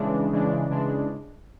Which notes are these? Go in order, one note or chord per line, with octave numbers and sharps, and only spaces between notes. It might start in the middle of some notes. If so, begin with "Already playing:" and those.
Already playing: C#3 E3 G#3 D4
C#3 E3 G#3 D4
C#3 E3 G#3 D4